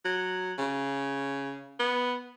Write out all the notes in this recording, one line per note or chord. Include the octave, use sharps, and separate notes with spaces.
F#3
C#3
B3